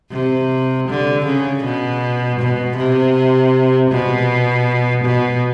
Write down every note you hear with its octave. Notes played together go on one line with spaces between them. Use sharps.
C3
D3
C#3
B2
B2
C3
B2
B2